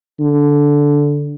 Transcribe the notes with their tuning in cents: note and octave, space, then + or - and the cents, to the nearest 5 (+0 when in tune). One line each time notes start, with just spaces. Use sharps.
D3 -10